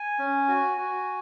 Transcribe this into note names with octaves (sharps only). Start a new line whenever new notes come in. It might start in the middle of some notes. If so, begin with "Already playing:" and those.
Already playing: G#5
C#4
F#4
F#4